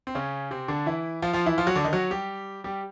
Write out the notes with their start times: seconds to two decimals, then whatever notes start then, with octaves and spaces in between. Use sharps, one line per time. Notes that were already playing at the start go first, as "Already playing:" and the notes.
0.07 C4
0.15 C#3 C#4
0.51 C3 C4
0.68 D3 D4
0.86 E3 E4
1.22 F3 F4
1.33 F3 F4
1.46 E3 E4
1.58 F3 F4
1.67 F#3 F#4
1.76 D3 D4
1.84 D#3 D#4
1.93 F#3 F#4
2.11 G3 G4
2.64 G3 G4